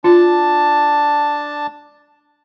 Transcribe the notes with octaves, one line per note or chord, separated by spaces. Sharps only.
D4 F4 A5